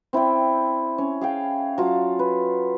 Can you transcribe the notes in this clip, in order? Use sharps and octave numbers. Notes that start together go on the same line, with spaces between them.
C4 E4 D5 G5
C#4
G#4 F5 G5
F#3 F4 A5
B4